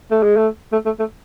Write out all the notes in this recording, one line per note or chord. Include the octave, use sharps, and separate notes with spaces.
A3
G#3
A3
A3
A3
A3